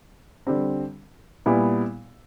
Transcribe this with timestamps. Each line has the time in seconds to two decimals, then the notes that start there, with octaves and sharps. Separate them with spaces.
0.47 D3 G3 C4
1.46 A#2 G3 B3 E4